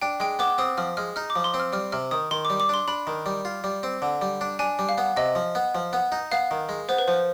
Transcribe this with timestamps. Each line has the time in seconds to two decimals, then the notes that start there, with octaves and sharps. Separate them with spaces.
0.02 D4 G5
0.20 G#3 G5
0.39 B3 D6
0.58 C4 D#6
0.78 F3 F6
0.97 G#3 F6
1.16 D#4 F6
1.30 D6
1.36 F3
1.44 C6
1.54 C4
1.60 F6
1.73 G3 F6
1.92 C3 F6
2.11 D#3 D#6
2.31 D#3 C6
2.45 D6
2.50 G3
2.60 D6
2.69 D4 C6
2.88 D4 B5
3.07 D#3
3.26 G3
3.45 F4
3.64 G3
3.83 C4
4.02 D3
4.22 G3
4.41 D4
4.59 D4 G#5
4.79 G3
4.89 F5
4.98 B3
5.17 C3 D#5
5.35 F3
5.55 B3
5.75 F3
5.93 B3
6.12 D#4
6.32 B3 F5
6.51 D#3
6.69 G#3
6.89 B3 C5
6.98 B4
7.08 F3 C5